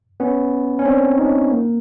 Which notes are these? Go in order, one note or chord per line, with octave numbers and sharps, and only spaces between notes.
B3 C#4
C#4
C4 D4
C#4 D#4
A#3